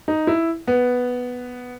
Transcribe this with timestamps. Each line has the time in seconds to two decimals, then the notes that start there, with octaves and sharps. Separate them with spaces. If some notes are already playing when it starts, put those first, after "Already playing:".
0.08 D#4
0.27 E4
0.68 B3